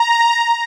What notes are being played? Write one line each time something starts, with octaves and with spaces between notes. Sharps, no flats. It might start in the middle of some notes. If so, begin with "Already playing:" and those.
Already playing: A#5